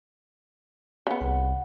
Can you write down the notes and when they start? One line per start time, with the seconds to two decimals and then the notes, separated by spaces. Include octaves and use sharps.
1.07 C#3 B3
1.21 C2 F#5